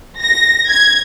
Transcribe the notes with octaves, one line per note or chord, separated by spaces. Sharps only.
A#6
G#6